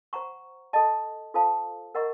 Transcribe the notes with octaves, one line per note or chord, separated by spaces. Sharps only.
C5 F#5 A#5 C#6
A4 D#5 A5
F4 A4 C5 F5 A5
A#4 D#5 F#5 A#5 C#6